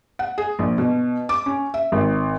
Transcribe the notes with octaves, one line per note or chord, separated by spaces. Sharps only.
F#5
G#4
A#1
B2
D6
C#4
E5
G#1